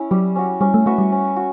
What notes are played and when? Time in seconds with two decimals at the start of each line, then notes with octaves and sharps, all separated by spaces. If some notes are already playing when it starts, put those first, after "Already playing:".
Already playing: C#4 E4
0.11 F#3 G3
0.36 C#4 F#4
0.61 G3 C#4
0.74 A3
0.86 A3 F#4 B4 E5
0.98 G3
1.12 C#4
1.36 F#4